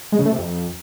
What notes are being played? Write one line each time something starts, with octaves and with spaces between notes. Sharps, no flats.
G#3
C#3
A3
C3
F2